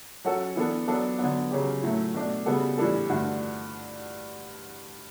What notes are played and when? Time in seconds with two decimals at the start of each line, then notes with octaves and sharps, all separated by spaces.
0.25 F#3 C#4 F#4 A4
0.56 E3 B3 D4 A4
0.88 F#3 B3 D4 A4
1.19 D3 F#3 B3
1.51 C#3 F#3 C#4 G4
1.83 A2 F#3 A3
2.14 B2 A3 D4
2.46 C#3 G3 B3 F#4 A4
2.78 A2 E3 G3 D4 A4
3.09 G2 D3 A3 D4 F#4